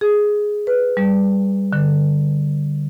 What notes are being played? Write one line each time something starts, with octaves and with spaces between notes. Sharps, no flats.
G#4
B4
G3
D3